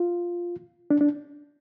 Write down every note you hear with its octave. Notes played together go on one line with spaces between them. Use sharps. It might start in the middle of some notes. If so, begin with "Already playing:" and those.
Already playing: F4
D4
D4